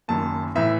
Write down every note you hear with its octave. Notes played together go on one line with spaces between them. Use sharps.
F#1 F#2 D#3 A5
A2 E3 E5